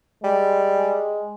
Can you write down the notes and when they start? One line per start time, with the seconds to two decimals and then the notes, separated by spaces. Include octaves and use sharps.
0.24 G3 G#3